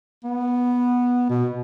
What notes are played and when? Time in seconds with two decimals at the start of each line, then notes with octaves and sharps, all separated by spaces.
0.24 B3
1.30 B2